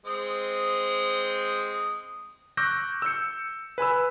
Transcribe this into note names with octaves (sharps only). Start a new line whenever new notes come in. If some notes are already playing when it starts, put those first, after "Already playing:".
G#3 C4 D#6
C#6 D6 E6 F#6 G6 A#6
E6 G6 C#7
B4 G#5 B5 E6